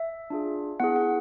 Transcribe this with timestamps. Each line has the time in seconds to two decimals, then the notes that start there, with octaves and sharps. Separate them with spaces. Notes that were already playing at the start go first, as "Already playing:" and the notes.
Already playing: E5
0.30 D4 F4 G#4
0.80 B3 E4 G#4 F#5
0.96 F#5